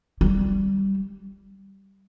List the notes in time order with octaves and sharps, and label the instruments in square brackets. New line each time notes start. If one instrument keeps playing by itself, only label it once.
[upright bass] G3